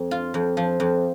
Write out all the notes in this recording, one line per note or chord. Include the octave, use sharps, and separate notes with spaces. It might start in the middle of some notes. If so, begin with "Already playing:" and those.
Already playing: F2
F4
F2
F3
F2